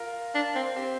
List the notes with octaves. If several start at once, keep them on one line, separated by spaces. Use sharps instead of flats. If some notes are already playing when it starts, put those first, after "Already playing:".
Already playing: F4 A#4
D4
C4
C4 G4